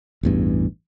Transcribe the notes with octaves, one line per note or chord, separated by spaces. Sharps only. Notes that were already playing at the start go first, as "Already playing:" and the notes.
A1 E2 G2